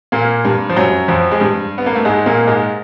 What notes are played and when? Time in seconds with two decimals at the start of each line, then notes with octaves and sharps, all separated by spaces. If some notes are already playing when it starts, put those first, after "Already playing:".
0.12 A#2 A#3
0.44 G2 G3
0.69 F3
0.76 F#2 F#3
1.08 F2 F3
1.31 G#3
1.40 G2 G3
1.78 B3
1.86 A#3
1.96 A3
2.05 G#2 G#3
2.26 A#2 A#3
2.47 G#2 G#3